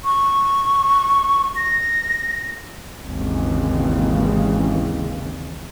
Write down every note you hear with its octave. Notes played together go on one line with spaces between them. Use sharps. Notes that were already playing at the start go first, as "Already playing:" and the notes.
C#6
A#6
G#1 D#2 C#3 E3 G#3